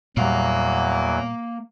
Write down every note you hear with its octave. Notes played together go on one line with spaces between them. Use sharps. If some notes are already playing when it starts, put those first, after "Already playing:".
E2 A#2 F#3 G3 A#3 F5